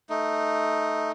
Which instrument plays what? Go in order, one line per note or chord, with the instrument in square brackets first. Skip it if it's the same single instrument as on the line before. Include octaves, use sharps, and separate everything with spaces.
[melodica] A3 D#4